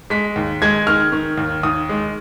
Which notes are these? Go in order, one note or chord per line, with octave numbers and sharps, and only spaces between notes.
G#3 B6
D#2
G#3 G#6
D#3 F6
D#3
D#2
D#2 D#6
G#3